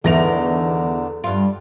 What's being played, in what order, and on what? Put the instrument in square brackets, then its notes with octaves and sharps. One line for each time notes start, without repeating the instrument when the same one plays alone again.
[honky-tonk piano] E2 A#6 F7 [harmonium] D3 [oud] D#3 A3 D4
[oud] G2 F4 [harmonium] G3